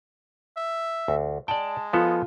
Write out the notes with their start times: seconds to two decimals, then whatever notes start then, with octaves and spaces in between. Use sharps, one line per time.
0.57 E5
1.08 D2
1.48 G#3 D5 G5 A5
1.93 F3 B3 F4 A4